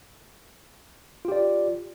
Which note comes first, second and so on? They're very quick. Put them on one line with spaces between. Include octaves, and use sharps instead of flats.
F4 G4 D5